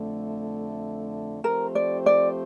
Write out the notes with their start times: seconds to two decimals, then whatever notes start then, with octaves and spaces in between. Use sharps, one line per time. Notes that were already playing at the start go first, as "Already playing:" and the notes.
Already playing: F2 D3 A3
1.44 F3 A3 C4 G4 A#4 C5
1.75 D5
2.06 D5